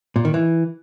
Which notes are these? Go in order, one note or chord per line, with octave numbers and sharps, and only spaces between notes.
A#2
D#3
E3